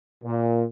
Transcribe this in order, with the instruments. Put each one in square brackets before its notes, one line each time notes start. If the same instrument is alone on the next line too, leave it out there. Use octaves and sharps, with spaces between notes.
[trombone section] A#2